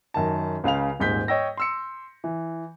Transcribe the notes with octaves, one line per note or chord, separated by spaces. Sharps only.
F#2 D#3 A5
C#2 C#3 F5 F7
D#1 G#2 G6 B6
C#5 D#5 G5 E6 A#6
C6 E6 C#7
E3